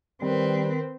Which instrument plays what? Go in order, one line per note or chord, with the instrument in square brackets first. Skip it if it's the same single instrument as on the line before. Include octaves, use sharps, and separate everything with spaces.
[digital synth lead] D#3 [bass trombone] G3 [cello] C4 B4